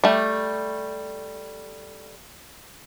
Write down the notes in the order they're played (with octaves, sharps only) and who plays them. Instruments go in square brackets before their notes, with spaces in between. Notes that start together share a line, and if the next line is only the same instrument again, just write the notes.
[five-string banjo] G3 A3